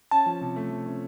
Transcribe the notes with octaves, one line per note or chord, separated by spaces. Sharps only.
C#4 A5
F3
C3
A3
F3
C#4